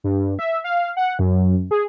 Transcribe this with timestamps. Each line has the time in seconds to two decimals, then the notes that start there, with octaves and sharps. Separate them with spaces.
0.04 G2
0.39 E5
0.64 F5
0.97 F#5
1.19 F#2
1.71 G#4